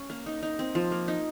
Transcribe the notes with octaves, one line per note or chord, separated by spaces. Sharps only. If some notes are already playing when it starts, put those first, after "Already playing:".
Already playing: C#4
A#3
D#4
D#4
C4
F3
A#3
D#4